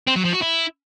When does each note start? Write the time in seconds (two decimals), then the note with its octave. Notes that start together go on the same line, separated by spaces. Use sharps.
0.08 C4
0.16 F#3
0.25 F3
0.34 F#4
0.42 E4